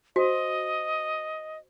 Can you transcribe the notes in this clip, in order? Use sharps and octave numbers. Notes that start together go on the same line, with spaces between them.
F#4 C5 D#5